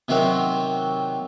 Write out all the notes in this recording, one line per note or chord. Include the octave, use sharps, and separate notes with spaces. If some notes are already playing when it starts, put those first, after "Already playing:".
C3 D#3 F#3 C4 F#4